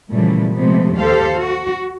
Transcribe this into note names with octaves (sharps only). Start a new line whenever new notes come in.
A#2 C#3 E3 F3 G3 A3
C3 F3 G#3 A3 B3
D#2 G4 A4 C5 F5
F#4